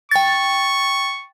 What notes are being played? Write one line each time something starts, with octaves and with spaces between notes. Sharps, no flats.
G5 C#6 A6